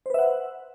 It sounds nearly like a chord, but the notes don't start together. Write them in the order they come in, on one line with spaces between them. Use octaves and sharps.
C5 B4 E5 F#5